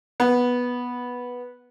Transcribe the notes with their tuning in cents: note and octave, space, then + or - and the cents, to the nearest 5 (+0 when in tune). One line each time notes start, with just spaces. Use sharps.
B3 -5